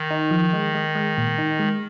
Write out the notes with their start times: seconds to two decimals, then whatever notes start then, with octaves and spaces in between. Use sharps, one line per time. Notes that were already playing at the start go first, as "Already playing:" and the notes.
Already playing: D#3
0.10 D#4
0.31 F3
0.53 G#3
0.75 G#3
0.95 G#3
1.17 A#2
1.38 D#4
1.59 G#3